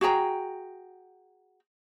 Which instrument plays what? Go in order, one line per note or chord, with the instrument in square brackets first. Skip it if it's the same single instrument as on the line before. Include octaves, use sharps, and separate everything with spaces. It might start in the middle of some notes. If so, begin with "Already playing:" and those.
[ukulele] F#4 G#4 G5 A#5